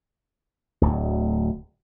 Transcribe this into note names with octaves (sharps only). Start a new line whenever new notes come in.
D1 D2